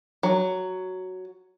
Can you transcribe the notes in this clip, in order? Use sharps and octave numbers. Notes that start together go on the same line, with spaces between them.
F#3